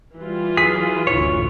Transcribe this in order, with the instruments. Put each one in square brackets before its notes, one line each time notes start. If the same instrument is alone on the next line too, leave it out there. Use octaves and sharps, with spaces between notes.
[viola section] E3 F4 [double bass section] G3
[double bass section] F#3 [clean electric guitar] G#4 [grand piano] B6
[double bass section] F#1 D2 A2 [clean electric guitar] C#5